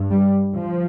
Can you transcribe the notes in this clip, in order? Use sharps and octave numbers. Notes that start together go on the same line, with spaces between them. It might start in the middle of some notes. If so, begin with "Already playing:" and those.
Already playing: G2
G3
F3